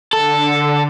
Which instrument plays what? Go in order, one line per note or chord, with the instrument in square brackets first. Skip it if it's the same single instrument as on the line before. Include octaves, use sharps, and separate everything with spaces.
[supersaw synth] D3 [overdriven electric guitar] A4